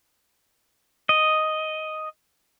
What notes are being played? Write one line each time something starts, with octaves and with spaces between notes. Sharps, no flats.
D#5